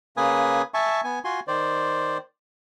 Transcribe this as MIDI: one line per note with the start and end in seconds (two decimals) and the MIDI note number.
0.17 0.62 49
0.17 0.62 58
0.17 0.62 71
0.17 0.62 80
0.17 0.62 87
0.74 1.01 76
0.74 1.01 80
0.74 1.01 81
0.74 1.01 85
1.04 1.19 59
1.04 1.19 80
1.24 1.40 65
1.24 1.40 66
1.24 1.40 80
1.24 1.40 84
1.48 2.18 51
1.48 2.18 72
1.48 2.18 74